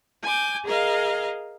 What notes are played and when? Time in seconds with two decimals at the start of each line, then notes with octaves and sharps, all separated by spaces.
0.23 G#5 D6 G6
0.65 G#4 A#4 D#5 F5